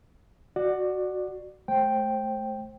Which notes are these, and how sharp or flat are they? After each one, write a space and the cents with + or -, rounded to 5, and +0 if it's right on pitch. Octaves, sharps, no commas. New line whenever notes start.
F#4 +0 D5 +20
A3 -25 C5 +25 G5 +0